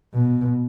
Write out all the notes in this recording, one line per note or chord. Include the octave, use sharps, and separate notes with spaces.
B2